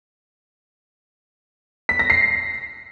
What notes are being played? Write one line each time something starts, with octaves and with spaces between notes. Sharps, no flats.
B6
A#6
C7